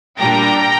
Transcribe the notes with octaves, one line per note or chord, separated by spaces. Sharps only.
A#2 G3 D4 G5 A#5